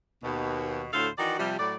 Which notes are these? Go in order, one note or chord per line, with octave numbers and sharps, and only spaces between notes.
D#2 B2
D2 A2 A4 C5 F5
D#3 E3 D#4 F#4 D5
C3 F3 G3
A2 F#3 D5